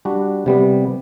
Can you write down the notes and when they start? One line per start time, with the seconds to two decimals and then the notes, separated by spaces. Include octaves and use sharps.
0.05 G3 D4 F#4
0.46 C3 G3 B3